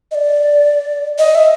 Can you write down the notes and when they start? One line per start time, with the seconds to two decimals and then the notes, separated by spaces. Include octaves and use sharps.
0.11 D#5
0.15 D5
1.19 D#5
1.35 E5